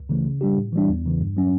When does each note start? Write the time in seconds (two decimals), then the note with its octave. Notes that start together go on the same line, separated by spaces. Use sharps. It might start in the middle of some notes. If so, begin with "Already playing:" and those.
Already playing: C#2
0.09 C#3 E3 A3
0.25 C#3
0.41 G3 D4 G4
0.57 A2
0.73 E3 G3 D4
0.89 E2
1.06 C#3 E3
1.20 G2
1.37 F#3 C#4